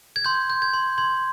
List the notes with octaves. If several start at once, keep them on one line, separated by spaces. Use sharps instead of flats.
G#6
C6 G6
G6
G#6
C6
C6 G#6